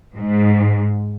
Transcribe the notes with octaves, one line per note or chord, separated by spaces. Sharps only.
G#2